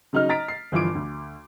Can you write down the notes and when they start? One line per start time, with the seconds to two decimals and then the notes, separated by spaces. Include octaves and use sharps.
0.13 C#3 F#3 D#4 D#5 F6
0.29 D#5 A#5 A6 B6 D7
0.48 C7
0.72 G1 E3 F3 F4 D6 D7
0.95 D2